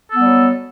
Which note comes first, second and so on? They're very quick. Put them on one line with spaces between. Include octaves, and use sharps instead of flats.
A4 B3 G3 F#3